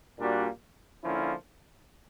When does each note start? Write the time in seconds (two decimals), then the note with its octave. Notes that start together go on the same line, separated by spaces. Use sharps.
0.18 A#2 G3 A#3 D4 F#4
1.03 D3 F3 A#3 C#4 E4